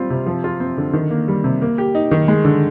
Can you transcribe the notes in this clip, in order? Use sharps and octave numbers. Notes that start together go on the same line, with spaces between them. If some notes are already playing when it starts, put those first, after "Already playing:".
Already playing: G3 C4 F4
C3
F3
F4
C4
D3
D#3
A#3
G3
C3
A#3
G4
D#4
D#3
G#3
D3